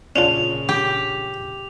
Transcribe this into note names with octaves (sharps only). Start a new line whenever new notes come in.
A#2 C#3 C#4 D4 F4 F7
G4